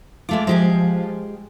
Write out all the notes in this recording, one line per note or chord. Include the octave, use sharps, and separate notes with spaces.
G#3 A3 F4 D6
F3 G#3 G4 G#5